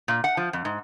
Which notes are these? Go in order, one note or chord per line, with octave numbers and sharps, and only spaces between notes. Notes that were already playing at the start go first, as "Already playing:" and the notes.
A#2
F#5
F3
F2
G#2